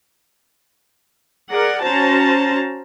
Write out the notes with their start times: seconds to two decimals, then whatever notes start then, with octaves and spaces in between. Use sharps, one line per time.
1.50 G#4 A#4 D5 F#5
1.83 C#4 F#4 C5 A5 A#5